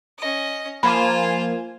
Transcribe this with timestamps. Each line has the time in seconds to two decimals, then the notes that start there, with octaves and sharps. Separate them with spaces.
0.19 C#4 D#5
0.83 F3 A#3 F4 C5 G#5 B5